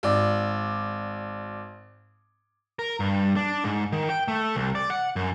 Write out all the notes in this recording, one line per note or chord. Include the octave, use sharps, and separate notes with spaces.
G#1 D5
A#4
G2
D4
G#2
D#3
G5
A3
C2
D5
F#5
F#2